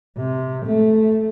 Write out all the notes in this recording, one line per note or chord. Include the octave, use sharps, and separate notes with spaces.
C3
A3